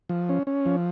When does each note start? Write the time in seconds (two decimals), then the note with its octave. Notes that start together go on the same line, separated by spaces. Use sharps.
0.09 F3
0.29 C#4
0.47 C#4
0.66 F3